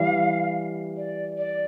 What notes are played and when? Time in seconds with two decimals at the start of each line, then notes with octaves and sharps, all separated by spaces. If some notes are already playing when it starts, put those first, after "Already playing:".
Already playing: E3 G3 F5
0.97 D5
1.38 D5